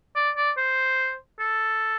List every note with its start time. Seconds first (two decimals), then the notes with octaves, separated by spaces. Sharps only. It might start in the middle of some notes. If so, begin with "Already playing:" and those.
0.16 D5
0.37 D5
0.57 C5
1.39 A4